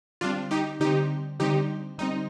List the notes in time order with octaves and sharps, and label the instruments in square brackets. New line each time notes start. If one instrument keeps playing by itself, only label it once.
[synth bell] D3 G3 C4 [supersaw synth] D4 F4
[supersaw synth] D#4 G4
[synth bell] D3 G3 C4 [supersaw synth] D#4 G4
[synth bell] D3 G3 C4 [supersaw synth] D#4 G4
[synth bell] D3 G3 C4 [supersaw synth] D#4